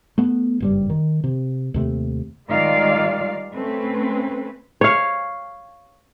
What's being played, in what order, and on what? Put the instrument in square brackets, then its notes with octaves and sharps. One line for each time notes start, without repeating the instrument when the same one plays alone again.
[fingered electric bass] A3 B3
F#1 G2 G3
D#3
C3
D#2 C3 A3
[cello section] D#3 G3 G#3 F4 D5 F5
A3 C4 C#4 B4
[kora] C#5 F5